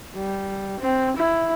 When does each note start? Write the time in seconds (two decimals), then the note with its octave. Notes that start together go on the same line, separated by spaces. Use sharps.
0.15 G3
0.80 C4
1.16 E4